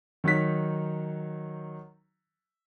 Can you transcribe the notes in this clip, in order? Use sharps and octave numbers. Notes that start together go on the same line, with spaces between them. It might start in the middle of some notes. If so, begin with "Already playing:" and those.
D#3 F#3 D#4 B6